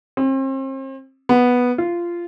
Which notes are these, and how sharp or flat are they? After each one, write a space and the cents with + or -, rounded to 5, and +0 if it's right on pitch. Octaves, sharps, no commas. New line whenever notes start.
C4 +40
B3 -5
F4 -15